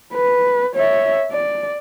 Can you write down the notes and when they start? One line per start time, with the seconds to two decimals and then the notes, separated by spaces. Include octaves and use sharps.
0.13 B4
0.75 C#5 E5
1.32 D5